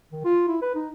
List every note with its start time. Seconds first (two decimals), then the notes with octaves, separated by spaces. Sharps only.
0.12 D#3
0.25 F4
0.48 E4
0.62 B4
0.75 D#4